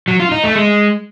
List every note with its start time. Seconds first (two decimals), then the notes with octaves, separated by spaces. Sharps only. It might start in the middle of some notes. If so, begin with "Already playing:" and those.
0.08 F#3
0.20 F4
0.32 D#4
0.44 A3
0.56 G#3